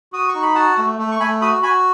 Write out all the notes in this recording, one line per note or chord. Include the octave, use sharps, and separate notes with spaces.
F#4 D#6
C#6
D#4
B5
F#4 F#5 A5
A3
A3
C#6
A3 G#5 B5
F#4 B5 D#6
F#4 G#5 B5